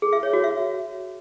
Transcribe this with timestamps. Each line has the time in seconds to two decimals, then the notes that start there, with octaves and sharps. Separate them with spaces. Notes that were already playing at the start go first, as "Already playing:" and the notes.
0.02 G#4
0.13 E5
0.23 C#5
0.33 F#4
0.44 E5